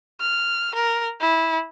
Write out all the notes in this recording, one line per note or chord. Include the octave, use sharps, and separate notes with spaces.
F6
A#4
E4